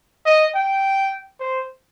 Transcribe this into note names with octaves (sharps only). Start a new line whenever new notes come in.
D#5
G5
C5